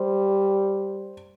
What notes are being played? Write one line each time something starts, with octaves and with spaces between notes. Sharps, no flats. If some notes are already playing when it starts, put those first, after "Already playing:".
Already playing: G3 C5